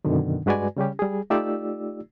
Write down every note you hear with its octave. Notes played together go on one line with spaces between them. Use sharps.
F#2 B2 D3 D#3
G2 G#3 F#4 B4 D5 G#5
C#3 G3 C#4 G4
G3 G#4
A3 D#4 F4 G4 D5 E6